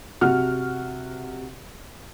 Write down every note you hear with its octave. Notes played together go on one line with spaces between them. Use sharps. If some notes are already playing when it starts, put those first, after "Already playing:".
C3 F#4 F#5 F6